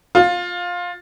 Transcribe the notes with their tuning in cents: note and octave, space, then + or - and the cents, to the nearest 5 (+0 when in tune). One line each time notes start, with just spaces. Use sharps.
F4 +15